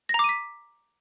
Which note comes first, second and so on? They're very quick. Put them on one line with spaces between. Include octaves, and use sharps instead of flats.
A#6 A#5 D6 D#7 B6